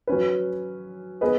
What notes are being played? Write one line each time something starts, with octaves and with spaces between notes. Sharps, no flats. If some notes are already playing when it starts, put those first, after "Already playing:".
F#3 C#4 B4
B3 G#4 B4 D#5